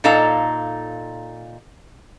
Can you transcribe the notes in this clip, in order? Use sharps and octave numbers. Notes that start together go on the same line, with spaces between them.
A#2 D#4 A4 F5 A#5